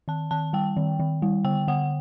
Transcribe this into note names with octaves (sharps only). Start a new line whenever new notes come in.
D#3 A5
D#3 A5
G3 G5
D#3
D#3
G3
D3 G5
D3 F#5